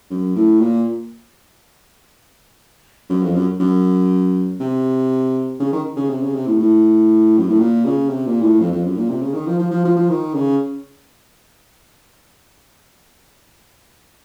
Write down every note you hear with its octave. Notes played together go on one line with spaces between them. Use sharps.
F#2
A2
A#2
F#2
F2
F#2
F#2
C3
C#3
D#3
C#3
C3
C#3
C3
A2
A2
F#2
A2
A#2
C#3
C3
A#2
A2
F2
F2
F#2
A#2
C3
C#3
D#3
F3
F3
F3
F3
F3
D#3
C#3